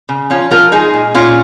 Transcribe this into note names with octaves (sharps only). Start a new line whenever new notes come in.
C#3
F3 C#4 F4
F3 F4 A#4
G#3 D#4 G#4
A#2
A#2 C#4 F4